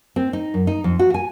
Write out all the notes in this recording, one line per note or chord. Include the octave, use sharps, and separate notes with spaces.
C4
D#4
F#2
D#4
F2
F#4
G#5